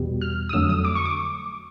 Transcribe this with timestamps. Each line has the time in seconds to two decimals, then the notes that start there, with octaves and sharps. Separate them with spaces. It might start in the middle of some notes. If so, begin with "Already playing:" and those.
Already playing: E2 B2 G3
0.21 F6
0.49 D#6
0.53 F2 D3 F#3 A3 E6
0.69 D#6
0.85 D6
0.95 C#6
1.05 D6